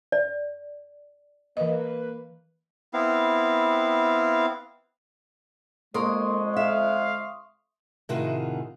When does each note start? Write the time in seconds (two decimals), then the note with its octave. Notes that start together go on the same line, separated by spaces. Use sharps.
0.12 D5
1.57 E3 A#3 B4 D#5
2.94 B3 C4 E4 F5
5.95 F2 D3 G#3 A#3 A#4 C6 C#6 D#6
6.56 E5 F5
8.09 A2 C3 D#3 F4 F#4 G#4